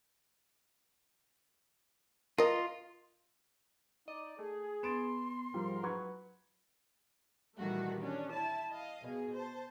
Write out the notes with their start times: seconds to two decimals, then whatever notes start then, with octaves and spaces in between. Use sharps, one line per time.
2.38 F4 A#4 D#5
4.08 D#4 D5 D#5
4.39 A3 G#4
4.83 B3 C6 A6 D7 E7
5.54 G#2 F3 G3 A#4
5.83 F#3 B4 C#6 G#6
7.57 A#2 D#3 E3 G3 A3 F#4
8.01 C#4 D4
8.32 E4 A5
8.70 D#5 F5
9.02 B2 G#4
9.35 C5 A5